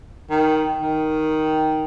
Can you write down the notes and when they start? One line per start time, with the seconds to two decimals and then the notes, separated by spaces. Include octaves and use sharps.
0.30 D#3
0.82 D#3